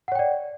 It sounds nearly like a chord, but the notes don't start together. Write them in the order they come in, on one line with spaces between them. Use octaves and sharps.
F#5 C#5 G5 D5